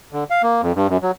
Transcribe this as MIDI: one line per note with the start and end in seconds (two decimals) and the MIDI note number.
0.13 0.24 50
0.30 0.42 77
0.43 0.62 58
0.62 0.72 41
0.76 0.87 43
0.89 0.97 42
1.03 1.11 54